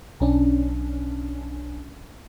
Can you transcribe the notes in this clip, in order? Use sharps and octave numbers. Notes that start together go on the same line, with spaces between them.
B1 C#4 D4